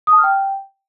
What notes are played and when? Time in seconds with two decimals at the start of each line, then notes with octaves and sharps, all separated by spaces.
0.07 D#6
0.13 A5
0.18 F6
0.24 G5